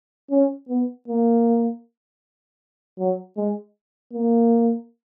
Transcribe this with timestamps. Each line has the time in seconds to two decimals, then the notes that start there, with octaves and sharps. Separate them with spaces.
0.31 C#4
0.69 B3
1.08 A#3
2.99 F#3
3.37 G#3
4.13 A#3